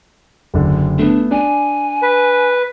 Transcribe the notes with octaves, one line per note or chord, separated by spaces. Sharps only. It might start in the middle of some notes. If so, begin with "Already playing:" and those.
F#1 D3
A3 B3 D4
D4 G#5
B4